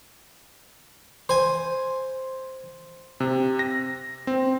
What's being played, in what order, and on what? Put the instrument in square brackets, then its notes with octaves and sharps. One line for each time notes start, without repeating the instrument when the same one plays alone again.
[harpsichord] C5 G#5
[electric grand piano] C3
A#6
C4